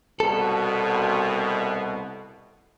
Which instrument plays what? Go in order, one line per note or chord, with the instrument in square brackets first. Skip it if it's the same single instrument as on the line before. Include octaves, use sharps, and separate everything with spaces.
[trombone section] C2 B2 [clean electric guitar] A4